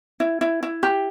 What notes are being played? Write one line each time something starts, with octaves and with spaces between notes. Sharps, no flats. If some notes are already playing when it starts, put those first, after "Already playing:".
E4
E4
E4
G4